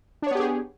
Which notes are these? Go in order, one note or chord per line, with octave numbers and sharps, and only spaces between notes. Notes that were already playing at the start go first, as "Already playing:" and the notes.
B3 D4 G4 G#4 C#5